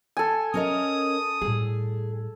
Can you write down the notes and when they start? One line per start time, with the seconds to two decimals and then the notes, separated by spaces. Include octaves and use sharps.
0.17 A4 G#5
0.54 C#4 A#4 D#5 D#6
1.41 A2 G3 G#4